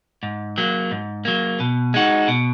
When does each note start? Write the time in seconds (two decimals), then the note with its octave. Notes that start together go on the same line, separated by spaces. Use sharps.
0.23 G#2
0.58 F#3 A#3
0.91 G#2
1.25 F#3 A#3
1.60 B2
1.94 G#3 D#4 F#4
2.28 B2